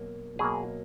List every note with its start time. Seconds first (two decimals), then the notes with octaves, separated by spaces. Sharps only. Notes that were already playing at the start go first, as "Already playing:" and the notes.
Already playing: B2 F#3 A#3
0.39 B2 F#3 A#3 G#4